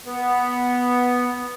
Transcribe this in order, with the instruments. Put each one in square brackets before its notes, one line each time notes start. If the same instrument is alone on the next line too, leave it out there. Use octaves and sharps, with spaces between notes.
[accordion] B3